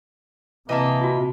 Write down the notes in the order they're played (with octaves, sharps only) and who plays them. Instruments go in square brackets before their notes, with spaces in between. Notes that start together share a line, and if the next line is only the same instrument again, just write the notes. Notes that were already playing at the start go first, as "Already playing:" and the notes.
[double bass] C3 [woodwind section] E3 A#3 [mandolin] D#5 E5 A5
[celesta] F4 F#4